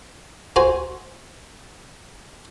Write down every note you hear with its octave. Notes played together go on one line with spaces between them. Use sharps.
F#4 C5 G#5 A#5